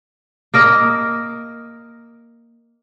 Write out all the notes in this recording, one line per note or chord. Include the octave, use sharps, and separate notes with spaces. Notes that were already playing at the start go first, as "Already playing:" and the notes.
A#3 A#4 D#5